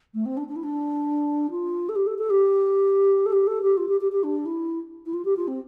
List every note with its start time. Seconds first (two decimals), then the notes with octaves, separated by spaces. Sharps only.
0.14 A3
0.25 C4
0.37 D4
0.48 D4
0.56 E4
0.63 D4
1.51 F4
1.89 A4
1.95 G4
2.07 A4
2.18 A4
2.30 G4
3.26 A4
3.32 G4
3.47 A4
3.62 G4
3.77 F4
3.88 G4
4.01 G4
4.12 G4
4.23 D4
4.45 E4
5.06 E4
5.13 F4
5.25 G4
5.37 F4
5.47 C4